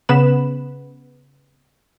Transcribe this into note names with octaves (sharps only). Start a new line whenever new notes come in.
C#3 B3 B4 B5 E7